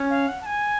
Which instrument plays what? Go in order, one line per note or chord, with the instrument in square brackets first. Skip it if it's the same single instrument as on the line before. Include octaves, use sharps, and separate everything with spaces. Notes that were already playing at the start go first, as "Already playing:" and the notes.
Already playing: [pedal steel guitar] C#4
[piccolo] F5
F#5
A5
G#5